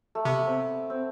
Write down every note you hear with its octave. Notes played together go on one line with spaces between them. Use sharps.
A3
C3 B3
C4
C4